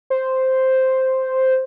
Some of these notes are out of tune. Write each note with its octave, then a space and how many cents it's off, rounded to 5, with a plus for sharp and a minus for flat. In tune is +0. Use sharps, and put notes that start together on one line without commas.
C5 +0